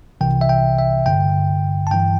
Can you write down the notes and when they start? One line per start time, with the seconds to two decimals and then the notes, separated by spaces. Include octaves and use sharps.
0.21 C2 C3 E3 G5
0.41 E5
0.49 G5
0.78 E5
1.06 G2 D3 G5
1.87 A5
1.91 G2 E3 G5